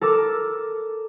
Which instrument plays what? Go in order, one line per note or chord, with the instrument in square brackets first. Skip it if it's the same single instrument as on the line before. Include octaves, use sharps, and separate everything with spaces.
[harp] A4 A#4 D6 E6